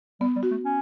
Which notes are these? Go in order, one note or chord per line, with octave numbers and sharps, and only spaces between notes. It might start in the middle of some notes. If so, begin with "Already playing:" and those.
G3 B3
G3
F#4
A3
C#4